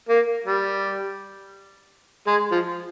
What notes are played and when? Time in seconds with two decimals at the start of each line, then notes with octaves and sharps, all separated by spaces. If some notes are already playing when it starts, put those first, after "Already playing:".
0.09 A#3
0.46 G3
2.27 G#3
2.51 F3